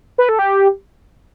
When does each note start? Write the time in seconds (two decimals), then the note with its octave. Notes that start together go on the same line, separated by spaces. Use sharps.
0.18 B4
0.29 A4
0.39 G4